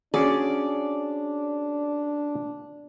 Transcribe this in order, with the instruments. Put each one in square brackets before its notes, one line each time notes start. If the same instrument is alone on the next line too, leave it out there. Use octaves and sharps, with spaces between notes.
[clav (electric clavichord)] C#4 F#4 G#4 [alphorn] D4 [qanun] D5